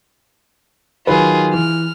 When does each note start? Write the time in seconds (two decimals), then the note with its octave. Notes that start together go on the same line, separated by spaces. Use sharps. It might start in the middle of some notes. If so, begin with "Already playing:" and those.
1.07 D#3 F#3 F4 G#4 B4
1.53 E3 F6